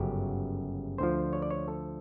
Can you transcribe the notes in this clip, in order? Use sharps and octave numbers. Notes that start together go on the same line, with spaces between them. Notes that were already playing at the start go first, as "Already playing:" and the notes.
Already playing: G1 F#2 C#3 F#3 G4
D2 D3 F3 C5
C#5
D5
C#5
A4